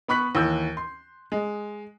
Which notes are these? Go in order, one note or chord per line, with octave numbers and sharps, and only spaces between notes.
B3 B5 C#6 F#6 B6 F#7
D#2 E3 E6 G6
C6
G#3